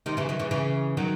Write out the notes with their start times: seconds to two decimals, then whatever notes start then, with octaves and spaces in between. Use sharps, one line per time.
0.06 C3 D#3
0.17 C#3 E3
0.29 D#3 F#3
0.39 C#3 E3
0.51 C#3 E3
0.97 D#3 F#3